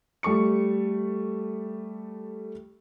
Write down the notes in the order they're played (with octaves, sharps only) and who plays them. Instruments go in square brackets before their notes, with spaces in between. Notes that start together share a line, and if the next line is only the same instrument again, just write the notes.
[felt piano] G3 A3 C#6 C#7